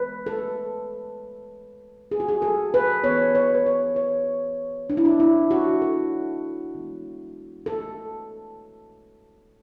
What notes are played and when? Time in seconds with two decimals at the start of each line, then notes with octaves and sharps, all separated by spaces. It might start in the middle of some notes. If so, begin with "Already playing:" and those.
Already playing: E3 G#3 B3 B4
0.26 A4
2.11 G#4
2.20 F#4
2.29 G#4
2.42 A4
2.74 B4
3.04 E3 B3 C#5
3.35 C#5
3.55 B4
3.66 C#5
3.96 C#5
4.90 D4
4.97 E4
5.05 D4
5.20 E4
5.51 F#4
5.82 A4
6.75 E3 G#3 B3
7.66 A4